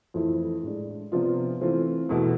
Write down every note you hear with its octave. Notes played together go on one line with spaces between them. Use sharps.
F2 E3 A3 E4
A2 G#3 D4
C3 F3 B3 D4 F4
E3 A3 C4 F4
E2 B2 A3 E4